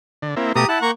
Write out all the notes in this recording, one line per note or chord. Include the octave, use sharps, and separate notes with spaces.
D3
A#3 C4 E4
B2 A3 G4 A#5 D#6
E4 F#5 A5
A#3 A#5 C#6